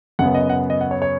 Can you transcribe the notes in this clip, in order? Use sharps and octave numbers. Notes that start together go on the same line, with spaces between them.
F#2 C#3 B3 F#5
D#5
F#5
D#5
F#5
C#5
C#5